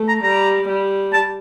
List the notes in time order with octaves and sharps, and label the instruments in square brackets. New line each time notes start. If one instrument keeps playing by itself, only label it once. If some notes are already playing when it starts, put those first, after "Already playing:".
Already playing: [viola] A3
[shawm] A#5
[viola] G3 [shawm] A#5
[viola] G3
[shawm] A5